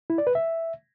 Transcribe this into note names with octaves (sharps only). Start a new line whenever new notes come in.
E4
D5
B4
E5